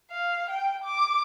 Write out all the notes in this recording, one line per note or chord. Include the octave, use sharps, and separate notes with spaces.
F5
G5
D6